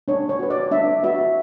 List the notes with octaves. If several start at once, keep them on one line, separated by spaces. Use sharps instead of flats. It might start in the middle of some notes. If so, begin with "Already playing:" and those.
D4 C#5
C#5
F#4 B4
D5
D4 E5
F#4 B4 E5